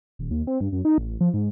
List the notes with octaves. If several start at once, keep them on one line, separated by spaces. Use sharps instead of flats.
D#1
D#2
C4
G2
F#2
D#4
A1
F3
G#2